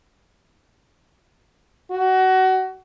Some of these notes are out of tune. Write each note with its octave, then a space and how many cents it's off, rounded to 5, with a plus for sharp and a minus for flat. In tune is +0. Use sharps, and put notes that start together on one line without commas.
F#4 +25